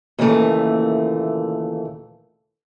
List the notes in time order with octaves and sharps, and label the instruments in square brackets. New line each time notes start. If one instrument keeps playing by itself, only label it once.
[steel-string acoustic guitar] D#2 A#2 C#3 E3 A3